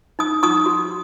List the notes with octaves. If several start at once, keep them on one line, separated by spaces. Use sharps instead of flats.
D#4 D#6
D#4 C#6 D#6
F#4